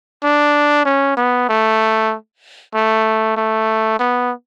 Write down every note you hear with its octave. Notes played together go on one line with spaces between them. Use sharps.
D4
C#4
B3
A3
A3
A3
B3